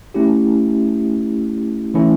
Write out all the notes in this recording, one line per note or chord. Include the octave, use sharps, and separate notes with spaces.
A3 C#4 E4 G4
E3 A3 C#4 E4